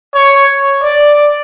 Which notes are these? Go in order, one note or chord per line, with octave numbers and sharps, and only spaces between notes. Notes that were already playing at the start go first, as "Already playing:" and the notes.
C#5
D5